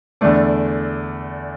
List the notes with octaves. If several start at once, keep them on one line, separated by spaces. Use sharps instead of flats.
E2 D3 A3 D4